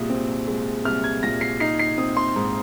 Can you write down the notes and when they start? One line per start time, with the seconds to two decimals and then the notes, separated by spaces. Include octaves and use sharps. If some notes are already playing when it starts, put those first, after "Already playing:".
Already playing: C2 A#2 G#3 D#6
0.10 C4
0.48 G#3
0.85 C2 F6
1.04 G#6
1.23 A#2 A#6
1.41 C7
1.60 D#4 C7
1.79 C7
1.98 C4 D#6
2.17 C6
2.36 G#2